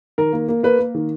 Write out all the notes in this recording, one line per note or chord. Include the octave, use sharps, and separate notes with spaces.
D#3 A#4
A#3
A#3
A#3 B4
A#3
D#3